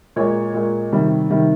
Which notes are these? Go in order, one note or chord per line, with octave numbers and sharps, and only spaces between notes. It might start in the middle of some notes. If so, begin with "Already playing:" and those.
A#2 G#3 C#5
A#2 G#3
C3 D#3 G3
C3 D#3 G3